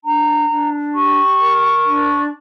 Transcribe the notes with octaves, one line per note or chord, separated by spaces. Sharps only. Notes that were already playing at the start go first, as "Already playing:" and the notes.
D4 A#5
D4
G4 C#6
A#4
D4